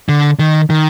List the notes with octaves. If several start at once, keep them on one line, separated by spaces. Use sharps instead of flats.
D3
D#3
D#3